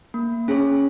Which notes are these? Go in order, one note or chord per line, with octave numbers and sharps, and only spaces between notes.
A#3
C#4 G#4 C#5